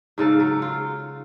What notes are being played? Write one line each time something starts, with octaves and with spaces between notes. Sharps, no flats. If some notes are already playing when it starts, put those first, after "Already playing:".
G#2 C#3 A4 F5
F#3
F4